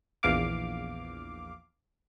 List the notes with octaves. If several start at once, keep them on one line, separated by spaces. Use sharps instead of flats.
A#1 E2 F5 D6